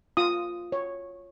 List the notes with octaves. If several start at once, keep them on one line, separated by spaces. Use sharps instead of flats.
F4 D#6
C#5